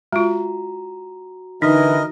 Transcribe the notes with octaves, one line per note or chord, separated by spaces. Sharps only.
G#3 F4 F#4 A#5
D3 E3 D#4 A#4 D#5